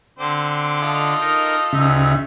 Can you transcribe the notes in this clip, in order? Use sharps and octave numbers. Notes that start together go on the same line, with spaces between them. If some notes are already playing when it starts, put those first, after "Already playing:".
D3 C4 C5 D6
F4 A4 D#5
D#4 A#4
D2 C#3 D#4 E5